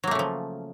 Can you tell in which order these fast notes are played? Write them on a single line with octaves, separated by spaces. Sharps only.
F#3 A#3 A3 C#3 F3